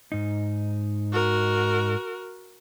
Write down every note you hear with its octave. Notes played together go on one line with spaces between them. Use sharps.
G#2 D#4
F#4 A#4